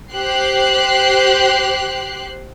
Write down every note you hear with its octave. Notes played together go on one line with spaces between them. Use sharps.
G4 C5 F#6 C7